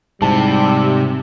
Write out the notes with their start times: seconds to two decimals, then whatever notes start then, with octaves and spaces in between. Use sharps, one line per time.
0.22 G#2 C3 G3 A5